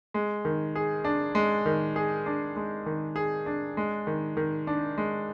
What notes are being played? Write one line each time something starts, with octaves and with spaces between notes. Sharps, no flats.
G#3
D#3
G#4
D4
G#3
D#3
G#4
D4
G#3
D#3
G#4
D4
G#3
D#3
D#3
D4
G#3